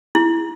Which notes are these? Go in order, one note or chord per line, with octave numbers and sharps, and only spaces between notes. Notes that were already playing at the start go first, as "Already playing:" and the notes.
E4